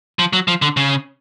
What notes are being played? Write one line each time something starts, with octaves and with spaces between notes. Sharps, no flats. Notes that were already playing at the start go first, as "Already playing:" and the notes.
F3
F#3
F3
D3
C#3